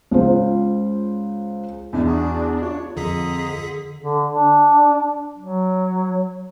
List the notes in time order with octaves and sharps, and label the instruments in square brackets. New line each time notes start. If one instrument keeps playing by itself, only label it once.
[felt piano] C#2 F4 C5
[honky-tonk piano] E2 [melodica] G3 G#3 E4 [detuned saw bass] D4
[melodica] F#4 G#4
[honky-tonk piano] F4 [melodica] C#5
[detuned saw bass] F2 [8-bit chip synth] D3 G#4 B6 [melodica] D#5 A#5
[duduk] D3
D4
F#3